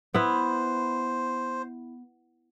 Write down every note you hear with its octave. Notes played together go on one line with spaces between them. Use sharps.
B3 E4 C5